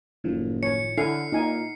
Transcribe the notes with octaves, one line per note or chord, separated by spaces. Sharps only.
F#1 A2 D#3 F3
C#5 C#7
D3 E4 A4 E5 F#5 G#5 F6 C7
A#2 D#4 G#5